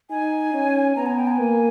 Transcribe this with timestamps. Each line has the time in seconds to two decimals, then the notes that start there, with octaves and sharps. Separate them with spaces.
0.10 D#4 G#5
0.54 C#4
0.96 B3 A#5
1.06 G#5
1.17 G5
1.27 A#5
1.30 G#5
1.40 A#3